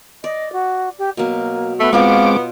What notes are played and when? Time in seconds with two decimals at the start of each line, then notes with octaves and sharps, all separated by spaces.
0.24 D5 D#5
0.53 F#4
0.99 G4
1.17 B2 F#3 A#3
1.80 A3 B3
1.93 B2 G#3 B3 C4 F4 C#5 F5 D6